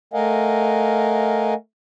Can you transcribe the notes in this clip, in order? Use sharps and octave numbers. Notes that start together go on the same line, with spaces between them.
A3 A#4 D#5 F5 F#5 G#5